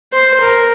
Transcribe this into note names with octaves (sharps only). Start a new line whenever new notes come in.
C5
A#4